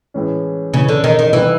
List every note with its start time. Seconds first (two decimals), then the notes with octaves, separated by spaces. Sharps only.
0.14 A2 E3 G#3 C#4
0.74 A2 C#3 E3 G#3 C#4
0.89 D3
1.04 D#3
1.19 D#3
1.33 C2 C3 D#3 E3 G3